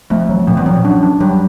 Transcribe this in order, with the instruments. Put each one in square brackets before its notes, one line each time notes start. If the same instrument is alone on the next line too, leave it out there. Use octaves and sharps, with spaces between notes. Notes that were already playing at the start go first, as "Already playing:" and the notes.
[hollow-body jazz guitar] F2 [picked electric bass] A3
[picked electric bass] F#3
[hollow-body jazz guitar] F2 [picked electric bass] A#2
[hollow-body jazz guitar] E2
[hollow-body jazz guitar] F2 [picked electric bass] F#3
[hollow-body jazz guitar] F#2 [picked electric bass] D4
[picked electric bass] D4
[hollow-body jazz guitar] G2 [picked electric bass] F#3